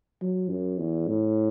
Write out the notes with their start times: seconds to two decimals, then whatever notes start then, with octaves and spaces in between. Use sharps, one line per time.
0.22 F#3
0.50 F#2
0.79 E2
1.07 A2